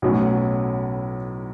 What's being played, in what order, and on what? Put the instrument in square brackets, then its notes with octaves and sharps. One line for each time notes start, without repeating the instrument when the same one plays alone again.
[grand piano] B1 A2 F#3 C#4